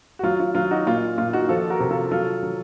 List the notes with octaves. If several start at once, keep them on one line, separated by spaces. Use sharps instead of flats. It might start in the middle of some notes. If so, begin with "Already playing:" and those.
F#4
F#3 F4
F4
F#3 F4
D#4 F#4
A#2 F4
A#2 F4
D#4 F#4
F3 F4 A4
F#4 A#4
C3
F4 A4
F#3 F4 A4
F#3